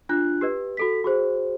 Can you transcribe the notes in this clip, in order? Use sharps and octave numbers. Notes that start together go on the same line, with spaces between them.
D4 F4 F#6
G4 B4 D#5
F#4 A4 B6
F#4 G#4 C5